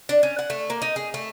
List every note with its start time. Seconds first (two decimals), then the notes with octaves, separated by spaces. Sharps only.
0.09 D4
0.23 C#4
0.39 F#5
0.50 A3
0.70 A#3
0.82 D#4
0.96 G#4
1.14 A3